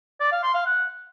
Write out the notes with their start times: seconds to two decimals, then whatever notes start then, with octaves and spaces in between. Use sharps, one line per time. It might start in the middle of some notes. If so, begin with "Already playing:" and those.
0.21 D5
0.32 F5
0.43 C6
0.54 F5
0.66 F#5